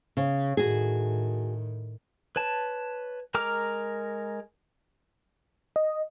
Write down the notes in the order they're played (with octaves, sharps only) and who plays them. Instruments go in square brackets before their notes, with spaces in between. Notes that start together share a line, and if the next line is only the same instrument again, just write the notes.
[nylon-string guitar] C#3
[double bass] A2 D#3 [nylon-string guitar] F#4 G#4
[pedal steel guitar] B4 C#5 A5
G#3 A#4 A#5 D6 F6
[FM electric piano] D#5